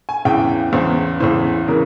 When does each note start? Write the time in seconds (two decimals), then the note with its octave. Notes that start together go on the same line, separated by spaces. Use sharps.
0.09 G#5
0.25 E2 C#3 E3 G5
0.73 E2 C#3 E3 C5
1.20 E2 C#3 E3 C5
1.68 C#3 E3 A#4